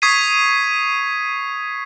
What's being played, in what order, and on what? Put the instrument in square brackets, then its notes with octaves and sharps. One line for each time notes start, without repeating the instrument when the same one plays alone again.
[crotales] C#6 D#6 G#6 B6 C7 D#7